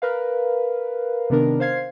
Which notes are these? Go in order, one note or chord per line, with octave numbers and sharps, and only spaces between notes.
A#4 B4 F5
C3 D#3 B3 D4 A#4
C5 F5 G#6 C7